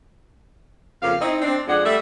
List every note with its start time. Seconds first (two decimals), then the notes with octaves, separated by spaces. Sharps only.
1.03 F2 C#3 A#3 F5
1.21 C4 D#4 E4
1.42 C4 D4
1.67 F2 G#3 D4 F4 G#4 F#5
1.85 G3 A3 E5